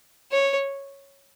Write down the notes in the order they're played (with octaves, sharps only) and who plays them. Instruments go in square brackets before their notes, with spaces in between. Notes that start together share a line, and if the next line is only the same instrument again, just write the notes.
[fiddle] C#5